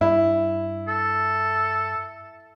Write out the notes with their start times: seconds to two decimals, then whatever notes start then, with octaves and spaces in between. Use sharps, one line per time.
0.01 G2 E4
0.88 A4